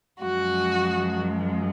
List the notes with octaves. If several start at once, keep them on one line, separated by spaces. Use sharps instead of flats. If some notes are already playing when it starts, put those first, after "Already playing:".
F#2 F3 G#3 F#4